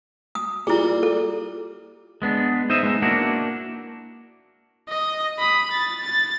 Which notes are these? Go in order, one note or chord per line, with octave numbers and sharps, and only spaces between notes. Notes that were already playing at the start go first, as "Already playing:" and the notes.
D#6
A#2 G3 E4 G#4
A4
G#3 B3 D4
D#4 C5 D#5 E5
G#3 B3 D#4
A#3 D4 E4 F#4
D#5
B5 D#6
A6
A6